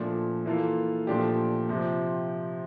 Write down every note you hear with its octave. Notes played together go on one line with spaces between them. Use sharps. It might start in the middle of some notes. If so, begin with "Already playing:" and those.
Already playing: A#2 F3 A3 D4
E3 A#3 F4 A4
A#2 F3 A3 D4 G4
C3 F3 C4